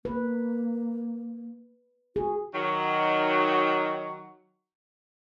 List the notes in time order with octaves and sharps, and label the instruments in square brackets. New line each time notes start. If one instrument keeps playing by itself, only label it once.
[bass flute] A#3 [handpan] B4
[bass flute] F#4 [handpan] G#4
[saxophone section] D#3 F#3